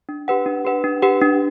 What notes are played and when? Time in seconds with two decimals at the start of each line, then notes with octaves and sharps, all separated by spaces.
0.09 D4
0.28 G4 B4 F#5
0.46 D4
0.65 G4 B4 F#5
0.84 D4
1.02 G4 B4 F#5
1.21 D4